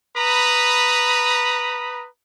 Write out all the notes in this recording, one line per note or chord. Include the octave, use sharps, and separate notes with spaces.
B4 A#5 B5 D#6